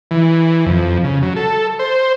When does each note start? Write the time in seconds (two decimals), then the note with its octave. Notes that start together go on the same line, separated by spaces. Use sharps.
0.11 E3
0.66 F2
1.04 C#3
1.22 F#3
1.36 A4
1.79 C5